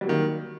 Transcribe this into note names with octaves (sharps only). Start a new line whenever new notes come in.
D#3 F#3 G3 A#3